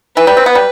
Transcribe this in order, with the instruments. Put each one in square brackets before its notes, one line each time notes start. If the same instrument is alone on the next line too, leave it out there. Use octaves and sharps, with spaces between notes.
[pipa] E3 [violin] B4
[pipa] G3
C4
B3
G3